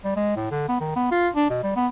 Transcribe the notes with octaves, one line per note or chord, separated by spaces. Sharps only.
G3
G#3
A2
D3
B3
D#3
B3
F4
D4
B2
G3
B3